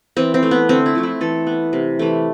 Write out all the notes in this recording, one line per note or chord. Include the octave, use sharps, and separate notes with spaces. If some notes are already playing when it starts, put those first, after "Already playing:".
E3 C4
C4
A3
B3
D3 C4
E4
F3 A3
E4
E3 A4
B3
C3
E3 A3